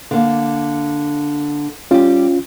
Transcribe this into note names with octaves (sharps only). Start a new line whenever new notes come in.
D3 A#3
G3 C#4 F4 G4